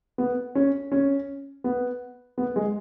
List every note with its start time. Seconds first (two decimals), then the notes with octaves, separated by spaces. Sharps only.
0.18 B3
0.55 C#4
0.92 C#4
1.64 B3
2.38 B3
2.56 G#3